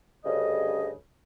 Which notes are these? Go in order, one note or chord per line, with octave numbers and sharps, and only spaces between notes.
D2 G2 C#3 D#5